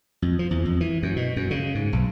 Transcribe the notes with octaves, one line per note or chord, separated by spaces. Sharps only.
F2
F3
E2
F2
E3
F#2
B2
F#2
C#3
G#2
B1